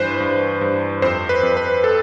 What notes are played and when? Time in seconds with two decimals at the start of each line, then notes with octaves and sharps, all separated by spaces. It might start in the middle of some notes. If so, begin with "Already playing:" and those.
Already playing: G2 E3 B4 C5
0.20 G2
0.61 G2
1.02 F2 C5
1.29 B4
1.43 F2
1.57 B4
1.84 A4